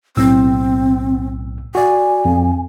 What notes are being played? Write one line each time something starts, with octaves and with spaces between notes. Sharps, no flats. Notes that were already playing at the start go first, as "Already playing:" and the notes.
B1 A2 C4 E6
F#4 D5 G#5
F2